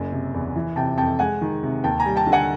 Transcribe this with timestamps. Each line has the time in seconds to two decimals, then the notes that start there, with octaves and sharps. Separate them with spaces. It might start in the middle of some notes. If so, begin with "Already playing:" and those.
Already playing: F#1 F#2
0.12 C3
0.34 E2
0.56 E3
0.76 C3 G5 A5
0.97 F2 G5 A5
1.19 G#3 F#5 G#5
1.42 D#3
1.63 C3
1.84 D#2 G5 A5
2.00 G#5 A#5
2.06 G3
2.16 G5 A5
2.27 D3
2.32 F#5 G#5